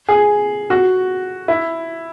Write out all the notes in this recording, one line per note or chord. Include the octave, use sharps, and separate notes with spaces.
G#4
F#4
E4